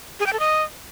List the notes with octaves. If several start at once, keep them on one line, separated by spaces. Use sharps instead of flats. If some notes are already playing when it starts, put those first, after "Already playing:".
G#4
G5
A4
D#5